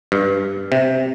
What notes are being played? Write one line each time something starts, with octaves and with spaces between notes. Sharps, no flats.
G2
C3